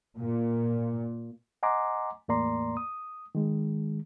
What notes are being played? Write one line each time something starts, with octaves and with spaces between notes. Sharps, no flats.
A#2
D#5 F#5 G#5 A#5 C6 D6
E2 A2 A#3 D5 A#5 C6
D#6
D#3 G#3